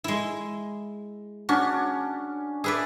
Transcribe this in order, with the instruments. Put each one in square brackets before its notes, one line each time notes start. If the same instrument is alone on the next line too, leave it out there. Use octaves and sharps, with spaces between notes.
[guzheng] G#3 E4
[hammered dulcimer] C#4 D4 [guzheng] F#4
[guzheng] G#4 B4 D5 [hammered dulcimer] E5